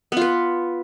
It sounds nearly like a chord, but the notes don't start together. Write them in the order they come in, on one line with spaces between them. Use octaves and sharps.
B3 F4 B4